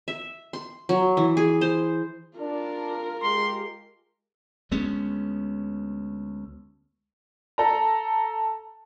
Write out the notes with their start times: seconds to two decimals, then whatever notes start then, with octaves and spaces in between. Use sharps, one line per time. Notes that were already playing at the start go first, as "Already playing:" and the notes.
0.08 E5
0.53 C6
0.89 F#3
1.17 E3
1.37 G#4
1.61 C5
2.39 D4 F4 A#4
3.22 G#3 G4 C6
4.71 D2 G#3 B3 C#4
7.58 A4 A#5